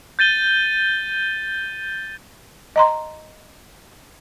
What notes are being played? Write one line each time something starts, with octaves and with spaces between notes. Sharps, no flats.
G6 A6 D#7 G7
D#5 A#5 C6